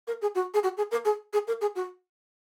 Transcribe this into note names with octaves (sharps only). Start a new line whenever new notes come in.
A#4
G#4
F#4
G#4
F#4
G#4
A#4
G#4
G#4
A#4
G#4
F#4